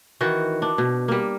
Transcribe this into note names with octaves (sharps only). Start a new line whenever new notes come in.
D#3 E3 F#4
D4
B2
G3 A#3